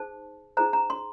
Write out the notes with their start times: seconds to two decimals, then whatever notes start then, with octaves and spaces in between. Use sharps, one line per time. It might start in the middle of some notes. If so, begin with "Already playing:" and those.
Already playing: D#4 G#4 C5 A5
0.57 D#4 G#4 C5 A#5
0.73 A#5
0.90 C6